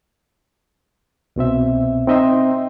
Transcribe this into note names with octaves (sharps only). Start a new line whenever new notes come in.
C2 B2 C4 E5
C4 D#4 D#5 E5 G5 C6